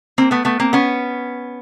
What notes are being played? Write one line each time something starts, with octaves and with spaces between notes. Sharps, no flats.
A#3 C4
A3 B3
A3 B3
A#3 C4
B3 C#4